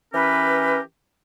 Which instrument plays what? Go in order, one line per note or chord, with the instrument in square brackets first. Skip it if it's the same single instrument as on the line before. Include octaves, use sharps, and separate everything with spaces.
[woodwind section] E3 C#4 G4 A#4 B4